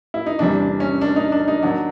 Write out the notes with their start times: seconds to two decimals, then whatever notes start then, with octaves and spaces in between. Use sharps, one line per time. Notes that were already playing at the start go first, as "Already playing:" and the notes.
0.14 E4
0.26 D#4
0.39 E2 C3 E3 G3 D4
0.60 D4
0.80 C#4
1.01 D4
1.16 D#4
1.32 D4
1.48 D#4
1.63 D#3 F#3 D4